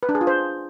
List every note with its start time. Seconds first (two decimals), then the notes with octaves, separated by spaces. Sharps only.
0.03 B4
0.09 D4
0.15 G#4
0.21 F4
0.27 C5